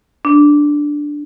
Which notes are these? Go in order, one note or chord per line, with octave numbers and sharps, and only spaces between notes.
D4